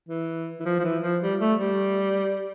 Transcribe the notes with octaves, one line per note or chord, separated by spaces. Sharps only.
E3
E3
F3
F3
E3
F3
G3
A3
G3